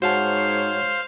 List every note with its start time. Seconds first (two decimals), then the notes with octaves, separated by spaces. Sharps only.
0.02 G#2 F#4 C5 C#5 F5 F#5 A5